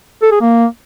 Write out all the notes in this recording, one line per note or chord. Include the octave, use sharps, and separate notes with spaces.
A4
G#4
A#3